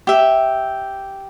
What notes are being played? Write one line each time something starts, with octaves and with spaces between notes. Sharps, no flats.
G4 E5